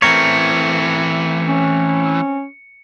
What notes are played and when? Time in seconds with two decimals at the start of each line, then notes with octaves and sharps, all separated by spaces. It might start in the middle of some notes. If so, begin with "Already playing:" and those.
0.02 E3 A3 C4 A#4 C#5 C#7
1.46 C#4